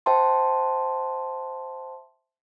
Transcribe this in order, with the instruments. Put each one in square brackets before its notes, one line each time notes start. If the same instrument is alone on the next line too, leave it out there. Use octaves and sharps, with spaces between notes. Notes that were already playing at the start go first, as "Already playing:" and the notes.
[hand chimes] C5 E5 G5 A5 C6